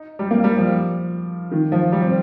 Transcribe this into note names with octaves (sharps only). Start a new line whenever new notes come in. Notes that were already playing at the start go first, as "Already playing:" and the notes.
Already playing: D#4
G3
A#3
G3
F3
D#3
F3
G3
C4